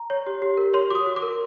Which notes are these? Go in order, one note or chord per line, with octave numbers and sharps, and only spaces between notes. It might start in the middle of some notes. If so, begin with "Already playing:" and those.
Already playing: A#5
C#5
G4
G4
A#4
C#5 C6
F#4 D6 D#6
F#4
D6
A#4